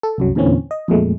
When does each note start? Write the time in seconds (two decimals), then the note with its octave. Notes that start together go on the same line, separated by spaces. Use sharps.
0.03 A4
0.18 C2 F#2 F#3
0.35 E2 A#2 D3 E3 C4 C#4
0.71 D#5
0.88 F2 A#2 G#3 A3